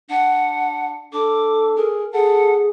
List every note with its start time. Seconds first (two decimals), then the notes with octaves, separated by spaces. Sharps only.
0.10 D4 F#5
1.13 D4 A4 D6
1.77 G#4 A#4
2.13 G#4 A4 F#5